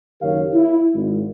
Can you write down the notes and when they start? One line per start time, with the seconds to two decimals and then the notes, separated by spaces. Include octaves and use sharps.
0.22 F#1 D#3 G4 A#4 C#5 F5
0.53 E4
0.95 G#1